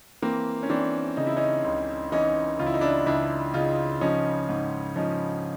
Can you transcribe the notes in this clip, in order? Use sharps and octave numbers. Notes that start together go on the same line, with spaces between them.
E3 A#3 C4
C#4
E3 C4 D4
C#3 D#4
E4
C#4 D#4
C#2
E3 C#4 D#4
C#2 F4
E4
D#4
D4 E4
C#2 D4 E4
C#3 D#4 F4
F3 C#4 D#4
G#2
F3 C#4 D#4